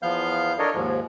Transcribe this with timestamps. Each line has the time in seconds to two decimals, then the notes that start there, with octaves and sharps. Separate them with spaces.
0.03 E2 F3 B3 F5 F6 G6
0.59 D4 A4 A#4 C#5 D#5
0.74 D#2 G#2 F3